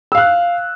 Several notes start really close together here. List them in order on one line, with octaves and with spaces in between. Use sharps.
E6 F5 F#6